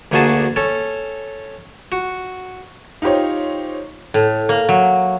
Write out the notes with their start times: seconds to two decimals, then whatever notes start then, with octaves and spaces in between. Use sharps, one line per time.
0.12 D2 D3 A#3 F#4 G#4 A5
0.56 C#4 A4
1.92 F#4
3.02 D#4 F4 G4 C5 C#5
4.14 A2
4.49 A#3
4.69 F#3